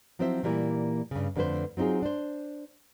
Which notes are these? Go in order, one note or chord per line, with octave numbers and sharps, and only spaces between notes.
F3 F#3 C4 E4 C5 E5
A#2 E3 G3 A#3 E4
G2 C#3
F2 D3 A3 B4 C5
F#3 C4 D#4 F4 G#4
D4 C5